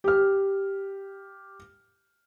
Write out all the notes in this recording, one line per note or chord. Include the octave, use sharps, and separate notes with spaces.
G4 F6